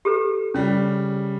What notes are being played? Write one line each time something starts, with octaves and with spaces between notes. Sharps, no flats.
G4 A4 B4
C#3 G3 C#4